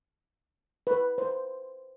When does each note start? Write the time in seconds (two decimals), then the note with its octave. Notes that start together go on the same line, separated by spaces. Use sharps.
0.87 B4
1.18 C5